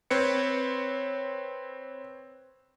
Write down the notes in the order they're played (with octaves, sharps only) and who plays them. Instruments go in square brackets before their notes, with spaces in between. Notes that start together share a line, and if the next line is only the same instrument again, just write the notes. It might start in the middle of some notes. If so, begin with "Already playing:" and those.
[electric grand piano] C4 B4 C#5 C#7